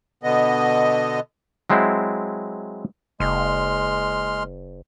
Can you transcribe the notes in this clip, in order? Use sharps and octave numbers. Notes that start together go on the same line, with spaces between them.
B2 D3 B3 D#5
F#3 G#3 C4 E4 F#5
F#1 G#3 C6 F6